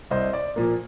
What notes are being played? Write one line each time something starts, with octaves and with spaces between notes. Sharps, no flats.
C2 C5 D#5
D5
A#2 F3 A#3